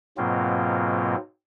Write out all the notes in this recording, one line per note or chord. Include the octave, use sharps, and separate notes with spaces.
G#2 B2 F#3 A#3 C4 F4